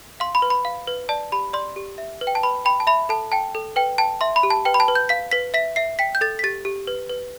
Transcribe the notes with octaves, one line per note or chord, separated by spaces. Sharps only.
F5 C6
B5
B4
B5
F5
B4
D5 A5
G4 B5
D5 C6
G4
E5
B4
G5
A5
B4 B5
G5 B5
A5
E5 B5
A4 A5
G5 A5
A4
B4 G5
G5 A5
E5 C6
B5
G4
A5
B4 G5
B5
A5
B4
G6
F5 B6
B4 B6
E5 B6
E5 C7
G5 B6
G6
A4 A6
B6
G4 A6
G4
B4
B4